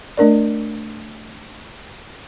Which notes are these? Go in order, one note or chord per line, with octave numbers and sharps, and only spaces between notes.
A3 D4 A#4 D5